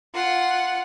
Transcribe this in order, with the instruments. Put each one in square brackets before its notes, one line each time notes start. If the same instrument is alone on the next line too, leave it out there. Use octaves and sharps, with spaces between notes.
[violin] F4 F#5